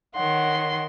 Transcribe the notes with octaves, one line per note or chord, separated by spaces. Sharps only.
D#3 C#5 F#5 C6